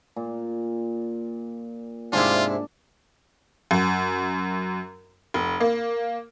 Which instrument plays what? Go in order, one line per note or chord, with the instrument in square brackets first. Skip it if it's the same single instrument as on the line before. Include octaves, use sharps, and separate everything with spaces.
[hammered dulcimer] A#2
[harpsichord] G#2 C3 E4 [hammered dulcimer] D4 [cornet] F4
[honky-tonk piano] F#2
F1
A#3